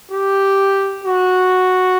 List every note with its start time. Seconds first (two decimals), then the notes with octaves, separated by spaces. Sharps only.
0.11 G4
1.04 F#4